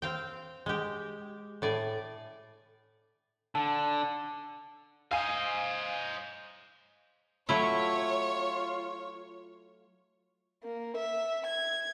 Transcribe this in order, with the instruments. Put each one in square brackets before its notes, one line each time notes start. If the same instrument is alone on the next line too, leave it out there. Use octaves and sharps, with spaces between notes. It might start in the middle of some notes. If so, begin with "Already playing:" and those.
[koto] C4 F5 G5
G#3 G4
A2 D5 G#5
[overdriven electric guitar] D3 [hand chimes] A5
[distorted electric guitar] C5 D#5 [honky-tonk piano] F5 G#5
[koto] F#3 A3 E4 [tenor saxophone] F4 [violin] C#5
[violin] A#3
E5
G#6